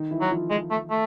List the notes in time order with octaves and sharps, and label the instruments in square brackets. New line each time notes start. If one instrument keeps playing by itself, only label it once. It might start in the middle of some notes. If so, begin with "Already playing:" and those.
Already playing: [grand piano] D#3 D#4
E3 E4
[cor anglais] F#3
[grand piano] F3 F4
[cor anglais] G#3
A3
A3